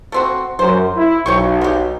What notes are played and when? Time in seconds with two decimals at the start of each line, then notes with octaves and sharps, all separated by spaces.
0.12 A3 C4 F#4
0.59 F#2 C5
0.97 E4
1.26 B1 C#5 G5 C#6
1.61 F#3 G4